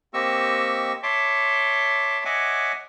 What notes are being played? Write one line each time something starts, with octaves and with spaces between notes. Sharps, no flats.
A#3 C4 G4 D#5 C#6 E6
C#5 E5 A5 C6 D6
C#5 D#5 E5 F#5 G#5 D6